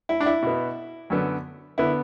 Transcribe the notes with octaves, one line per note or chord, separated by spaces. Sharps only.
E4
D4
E4
B2 B3
F#2 D3 B3
D3 B3 E4